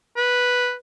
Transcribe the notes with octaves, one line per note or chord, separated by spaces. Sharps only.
B4